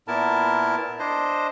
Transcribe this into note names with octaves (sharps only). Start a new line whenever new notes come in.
A#2 B3 E4 A#4 A5
D4 C5 D#5